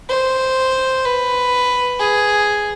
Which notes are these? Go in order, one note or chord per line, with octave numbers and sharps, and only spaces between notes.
C5
B4
G#4